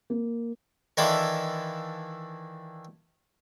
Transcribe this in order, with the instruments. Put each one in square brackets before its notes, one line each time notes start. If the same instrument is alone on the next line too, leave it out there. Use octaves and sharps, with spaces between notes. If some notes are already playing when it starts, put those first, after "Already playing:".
[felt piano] A#3
[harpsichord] D#3 E3 D4 E4 F4 A4